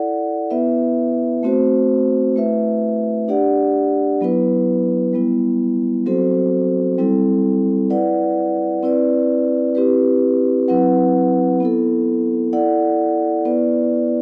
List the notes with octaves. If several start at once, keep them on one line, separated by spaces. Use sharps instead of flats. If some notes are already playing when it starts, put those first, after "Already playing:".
Already playing: E4 A4 D5 F#5
B3 E4 B4 E5
A3 C4 F#4 C5
A3 E4 B4 E5
D4 G4 D5 F#5
F#3 B3 E4 B4
G3 B3 E4
F#3 C4 F#4 A4 C5
G3 C4 E4 A4
E4 B4 D5 F#5
C4 E4 B4 D5
C4 E4 G4 B4
F#3 C4 E4 B4 F#5
B3 E4 A4
E4 A4 D5 F#5
B3 E4 B4 D5